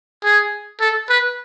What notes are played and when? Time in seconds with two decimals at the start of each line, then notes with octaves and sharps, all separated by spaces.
0.24 G#4
0.80 A4
1.09 B4